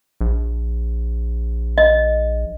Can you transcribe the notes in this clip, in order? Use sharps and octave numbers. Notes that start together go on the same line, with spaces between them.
A#1
D#5